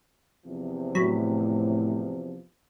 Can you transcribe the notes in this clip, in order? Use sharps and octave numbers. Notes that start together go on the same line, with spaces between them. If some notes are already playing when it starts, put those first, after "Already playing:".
E2 C3 F3
A2 F#3 B5